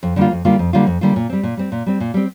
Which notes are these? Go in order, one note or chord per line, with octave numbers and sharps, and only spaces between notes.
F2
D3 G3 A#3 F4
F2
D3 G3 A#3 F4
F2
D3 G3 A#3 F4
F2
D3 G3 A#3 F4
A#2
G3 C4
A#2
G3 C4
A#2
G3 C4
A#2
G3 C4